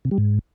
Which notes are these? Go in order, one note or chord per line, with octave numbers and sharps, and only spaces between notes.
C3
G3
G#2